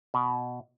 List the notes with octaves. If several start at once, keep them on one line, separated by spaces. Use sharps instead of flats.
B2